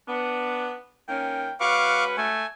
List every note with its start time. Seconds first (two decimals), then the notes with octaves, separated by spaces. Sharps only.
0.08 B3 D4
1.08 D#3 A#3 C#4 G5
1.60 G#3 C#4 F#4 B4 F5 C#6 D6
2.17 A3 G#5